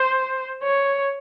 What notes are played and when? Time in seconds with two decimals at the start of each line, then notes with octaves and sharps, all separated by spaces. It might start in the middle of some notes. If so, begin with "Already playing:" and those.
Already playing: C5
0.63 C#5